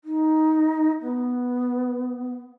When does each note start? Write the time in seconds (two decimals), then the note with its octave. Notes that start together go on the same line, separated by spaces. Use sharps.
0.04 D#4
1.02 B3